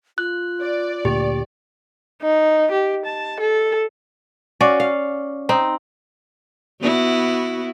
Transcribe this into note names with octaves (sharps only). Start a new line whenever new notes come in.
F4 F#6
D5
D2 A#2 G4
D#4
G4
A5
A4
C#4 F#4 D5 F5
F5
C4 D#4
B3 E4 F#4